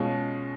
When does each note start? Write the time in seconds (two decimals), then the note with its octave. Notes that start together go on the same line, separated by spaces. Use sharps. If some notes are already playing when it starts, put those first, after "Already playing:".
Already playing: B2 G#3 C#4 F4